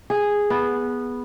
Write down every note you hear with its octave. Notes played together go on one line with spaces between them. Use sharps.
G#4
B3